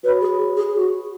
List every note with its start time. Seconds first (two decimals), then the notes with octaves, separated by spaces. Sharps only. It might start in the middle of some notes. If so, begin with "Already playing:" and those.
0.03 F#4 B4 C#5 B5
0.21 G#4
0.57 G#4
0.75 F#4